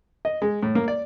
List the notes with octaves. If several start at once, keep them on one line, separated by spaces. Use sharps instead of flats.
D#5
G#3
A2
A#3
D5